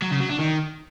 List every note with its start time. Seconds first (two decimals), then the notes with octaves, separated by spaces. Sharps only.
0.02 F#3
0.11 C#3
0.21 F#3
0.30 D4
0.39 D#3